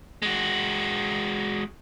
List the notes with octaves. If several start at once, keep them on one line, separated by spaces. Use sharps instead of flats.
G#3 F#4